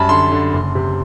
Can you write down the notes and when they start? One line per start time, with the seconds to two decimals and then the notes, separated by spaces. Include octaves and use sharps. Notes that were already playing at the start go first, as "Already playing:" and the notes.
Already playing: F#2 G3 A5 B5
0.09 D3 C6
0.32 D3
0.53 F#1
0.75 C3